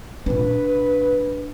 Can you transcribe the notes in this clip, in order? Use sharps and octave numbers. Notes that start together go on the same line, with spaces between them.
A#2 D4 B4